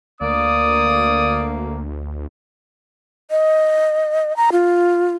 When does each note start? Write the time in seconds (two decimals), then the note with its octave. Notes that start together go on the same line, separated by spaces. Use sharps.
0.21 D2 A#3 D5 D#6
3.31 D#5
4.37 A#5
4.52 F4